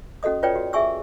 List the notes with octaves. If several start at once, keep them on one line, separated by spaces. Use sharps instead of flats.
C#4 F#4 A4 D#5 D#6
F4 B4 C#5 D5 G5
F#4
G#4 E5 G#5 C#6 E6